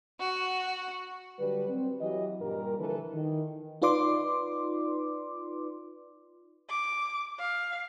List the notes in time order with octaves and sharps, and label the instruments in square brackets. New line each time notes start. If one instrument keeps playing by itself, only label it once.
[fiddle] F#4
[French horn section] D3 F#3 G3 D4 B4
C4
E3 F#3 G4 B4 D#5
G2 A#2 G3 A#4
D3 E3 F3 A4 B4
D#3 E3
[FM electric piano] D#4 F4 B4 D5 C6 D6
[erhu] D6
F5